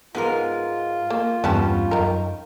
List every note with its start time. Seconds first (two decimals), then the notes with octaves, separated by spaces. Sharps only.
0.15 G#2 G#3 B3 F4 A#4
1.10 A#3
1.44 E2 G2 G3 B3 C#4 G4 A5
1.91 F#2 D#3 A#4